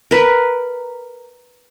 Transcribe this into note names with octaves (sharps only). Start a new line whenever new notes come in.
A#4 B4